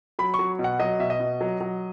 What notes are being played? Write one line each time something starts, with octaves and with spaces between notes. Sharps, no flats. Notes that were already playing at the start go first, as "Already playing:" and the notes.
F#3 B5
C#6
F#3
B2
F#5
F#3 D#5
B2 E5
D#5
B2
F#3
F#3